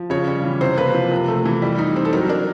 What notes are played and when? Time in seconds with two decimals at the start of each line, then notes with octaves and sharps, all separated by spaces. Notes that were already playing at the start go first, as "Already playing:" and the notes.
Already playing: F3
0.10 C#3 C#5
0.27 G3
0.44 E3
0.61 C3 C5
0.78 A#3 B4
0.94 F3
1.11 C3
1.28 A3
1.46 E3
1.62 G3
1.78 D#4
1.96 C4
2.05 A4
2.13 F#3 A#4
2.29 D4 A#4